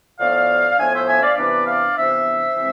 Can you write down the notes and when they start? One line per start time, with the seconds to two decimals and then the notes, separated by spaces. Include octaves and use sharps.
0.19 A2 F3 B3 D4 D5 F5
0.78 A2 F3 B3 D4 E5 G#5
0.93 C5 E5
1.07 E5 G#5
1.22 D5 F5
1.37 C3 E3 B3 D4 B4 D5
1.66 D5 F5
1.96 C3 E3 B3 D4 C5 E5
2.55 C3 E3 G#3 C4